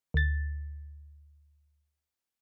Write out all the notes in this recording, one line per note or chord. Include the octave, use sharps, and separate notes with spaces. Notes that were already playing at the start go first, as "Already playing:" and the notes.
D2 A6